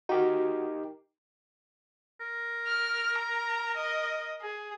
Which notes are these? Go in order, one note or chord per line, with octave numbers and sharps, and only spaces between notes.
D#4 F#4 G4 A#4
A#4
F6
A#5
D#5
G#4